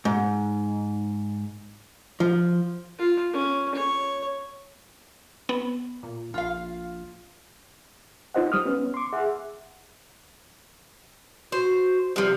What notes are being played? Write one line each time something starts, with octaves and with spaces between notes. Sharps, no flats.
G#2
F3
F4
C#4
C#5
B3
A#2
A#1 F4 F5
D#4 F4 C5 D#5 F#5
G3 D#6 F6
B3 C#4
C6 D6
G#4 E5 F#5
F#4 C5
C3 F3 G3